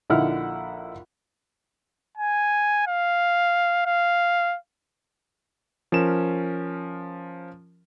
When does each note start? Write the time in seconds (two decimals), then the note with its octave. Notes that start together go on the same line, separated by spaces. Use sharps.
0.10 A#1 D3 D#4 E4 F#5 F6
2.18 G#5
2.87 F5
3.86 F5
5.92 F3 C#4 A#4 E7